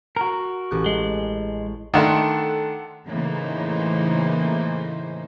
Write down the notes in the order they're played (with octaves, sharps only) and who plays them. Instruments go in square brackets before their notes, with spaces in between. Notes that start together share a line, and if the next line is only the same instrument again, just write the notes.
[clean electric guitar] F#4 A#4
[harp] A1 G4 F#6
[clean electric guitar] G#3
[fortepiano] D#3 A3 D4 [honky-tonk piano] A4 F#5 C6
[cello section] A2 C#3 E3 A#3 D#4 C5